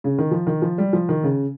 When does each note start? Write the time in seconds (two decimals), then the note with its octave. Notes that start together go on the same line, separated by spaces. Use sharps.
0.04 C#3
0.19 D#3
0.31 F3
0.47 D#3
0.62 F3
0.78 G3
0.93 F3
1.09 D#3
1.23 C#3